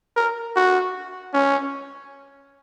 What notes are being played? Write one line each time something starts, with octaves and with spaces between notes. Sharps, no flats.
A#4
F#4
C#4